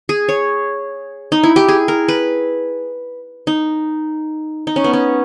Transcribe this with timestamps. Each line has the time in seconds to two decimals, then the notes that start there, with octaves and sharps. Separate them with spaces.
0.09 G#4
0.29 C#5
1.32 D#4
1.43 E4
1.56 G4
1.68 G#4
1.88 A#4
2.08 B4
3.47 D#4
4.67 D#4
4.76 C#4
4.84 B3
4.93 C#4